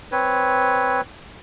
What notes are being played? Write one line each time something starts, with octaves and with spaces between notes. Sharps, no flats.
C4 B4 C#5